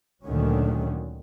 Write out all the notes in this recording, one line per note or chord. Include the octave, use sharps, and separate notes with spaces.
D2 A#2 D3 D#3 F#3 C#4